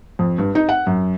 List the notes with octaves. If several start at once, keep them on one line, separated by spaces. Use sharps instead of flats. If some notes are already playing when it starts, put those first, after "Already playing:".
F2
G2
D#4
F#5
F#2